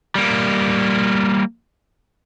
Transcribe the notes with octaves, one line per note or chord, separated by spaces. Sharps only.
G3 A#3